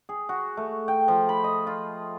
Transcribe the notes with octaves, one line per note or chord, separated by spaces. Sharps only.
G#4
F#4
A3
G5
F3
B5
D#5
F4